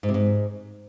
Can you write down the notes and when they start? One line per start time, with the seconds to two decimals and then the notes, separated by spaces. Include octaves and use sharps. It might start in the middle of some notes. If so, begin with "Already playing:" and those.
0.03 G#2
0.09 C3
0.14 G#2